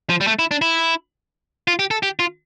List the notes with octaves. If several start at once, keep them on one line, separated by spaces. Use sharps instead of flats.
F3
G3
A3
E4
D4
E4
F4
G4
A4
G4
F4